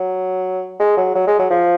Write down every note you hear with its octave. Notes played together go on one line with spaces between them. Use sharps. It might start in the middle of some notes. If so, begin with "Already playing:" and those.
Already playing: F#3
G#3
F#3
F#3
G#3
F#3
F3